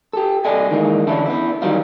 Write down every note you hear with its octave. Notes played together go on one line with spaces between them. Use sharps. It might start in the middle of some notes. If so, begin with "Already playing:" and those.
G4 A4
C2 A4 D5 D#5 G#5
D#3 E3 G#3 A#3
D3 E3 C#4 D4 E4
B3 E4
D#3 E3 F#3 G3 D#4 F4